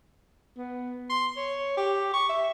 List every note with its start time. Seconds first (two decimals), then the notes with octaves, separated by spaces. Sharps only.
0.58 B3
1.10 C6
1.37 C#5
1.77 G4
2.13 C#6
2.29 E5